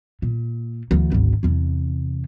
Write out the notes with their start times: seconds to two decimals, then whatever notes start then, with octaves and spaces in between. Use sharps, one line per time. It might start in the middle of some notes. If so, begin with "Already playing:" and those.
0.22 A#2
0.91 D2 E3
1.12 G#1 D2
1.43 E2 C3